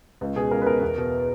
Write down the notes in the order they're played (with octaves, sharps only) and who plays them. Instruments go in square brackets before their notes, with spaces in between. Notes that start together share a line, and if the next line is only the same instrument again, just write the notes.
[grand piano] C#2
B2 G#4
C#2 A#4
B4
B2 A#4
E2
B2